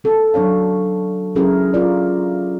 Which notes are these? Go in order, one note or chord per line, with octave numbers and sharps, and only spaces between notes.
B3 A4
F#3 D4 C#5 F5
F#3 C#4 E4 G#4 A#4
F4 A#4 C#5 D5